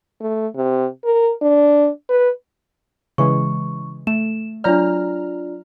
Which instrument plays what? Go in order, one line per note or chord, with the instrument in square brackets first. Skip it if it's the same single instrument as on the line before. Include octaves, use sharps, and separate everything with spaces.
[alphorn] A3
C3
A#4
D4
B4
[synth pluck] C#3 E3 G#3 [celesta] C#6
[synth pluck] A3 [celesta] E7
[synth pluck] F#3 A#5 F6 [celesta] D4 F4 D5